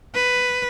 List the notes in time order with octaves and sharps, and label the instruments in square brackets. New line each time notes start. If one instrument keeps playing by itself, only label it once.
[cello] B4